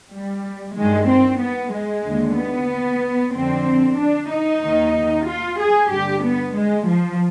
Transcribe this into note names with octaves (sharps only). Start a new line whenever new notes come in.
G3
G2 D#3 G#3
C4
B3
G#3
D#2 D3
B3
F2 D3 C4
D4
D#4
D#2 D#3
F4
G#4
G2 D3 G4
B3
G#3
F3